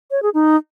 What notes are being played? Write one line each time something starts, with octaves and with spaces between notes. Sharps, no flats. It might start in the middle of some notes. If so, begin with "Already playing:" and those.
C#5
G#4
D#4